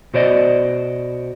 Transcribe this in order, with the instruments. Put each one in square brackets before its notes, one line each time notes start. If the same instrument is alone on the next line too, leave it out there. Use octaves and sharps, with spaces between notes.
[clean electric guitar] B2 F#4 C5 D5 D#5